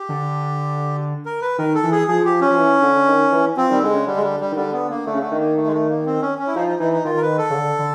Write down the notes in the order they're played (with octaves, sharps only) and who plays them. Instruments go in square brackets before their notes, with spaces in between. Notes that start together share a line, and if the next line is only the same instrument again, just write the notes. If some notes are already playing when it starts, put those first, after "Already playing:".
Already playing: [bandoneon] G4
[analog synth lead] D3
[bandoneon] A#4
B4
[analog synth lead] D#3 [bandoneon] A#4
[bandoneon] A4
[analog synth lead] E3
[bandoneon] G#4
[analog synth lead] F3 [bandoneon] G#4
[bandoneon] G4
C#4
[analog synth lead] F3
E3
D3
D3
D#3
E3
[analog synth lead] F3 [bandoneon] C4
[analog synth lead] D#3 [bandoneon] G3
[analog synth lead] D3 [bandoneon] G#3
[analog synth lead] C#3
[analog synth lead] D3 [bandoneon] G3
[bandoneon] G#3
G3
G3
[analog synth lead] D#3
[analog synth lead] D3 [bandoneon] G3
[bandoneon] B3
A#3
[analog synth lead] D3 [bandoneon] A3
[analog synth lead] C#3
[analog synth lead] D3 [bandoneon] A3
[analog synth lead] D#3
[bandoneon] A#3
A3
G#3
A3
A#3
C4
C#4
C#4
E4
[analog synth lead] F3 [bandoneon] D#4
[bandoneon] D#4
[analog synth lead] E3 [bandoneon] D#4
[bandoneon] D#4
[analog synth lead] D#3 [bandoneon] F4
[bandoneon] A#4
B4
A4
[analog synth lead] C#3
D3
D3